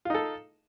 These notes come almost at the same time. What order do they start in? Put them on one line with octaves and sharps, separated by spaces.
F4 D#4 A4